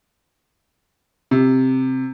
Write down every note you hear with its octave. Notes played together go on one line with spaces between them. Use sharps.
C3